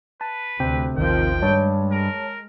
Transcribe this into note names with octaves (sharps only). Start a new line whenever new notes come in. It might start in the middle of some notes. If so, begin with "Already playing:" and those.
B4 A5
D2 C3 G5
A1 D#2 D#3 F3 G5
G2 G#3 C#5 A5
A#4